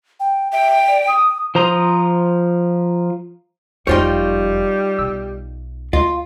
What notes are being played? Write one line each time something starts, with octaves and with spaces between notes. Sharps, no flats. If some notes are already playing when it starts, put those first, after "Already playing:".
G5
E5 G5
D5
D#6
F3 C5 A#5 C6 D#6
F#1 F2 G3 D#4 F4 C5 C#5 G5
B1 E6
D2 F4 D#5